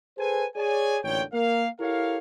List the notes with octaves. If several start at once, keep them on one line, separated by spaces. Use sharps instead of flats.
G#4 A4 B4 C5 G#5
G#4 C#5 D5 G#5
A1 A#2 D3 C#5 G5
A#3 A#4 F5
E4 G4 A4 A#4 C#5 F5